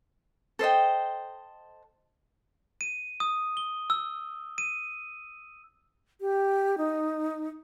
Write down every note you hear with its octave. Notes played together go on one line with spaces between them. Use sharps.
A4 C5 D#5 G5
D#7
D#6
G7
E6
D#7
G4
D#4